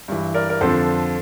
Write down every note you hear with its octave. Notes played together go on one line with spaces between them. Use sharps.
G2 E3
A#4 D5
A#4
F2 D3 F3 A4 C5